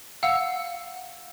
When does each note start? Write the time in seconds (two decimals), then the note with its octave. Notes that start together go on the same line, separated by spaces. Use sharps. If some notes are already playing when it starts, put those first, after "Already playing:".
0.23 F5 F#5 E6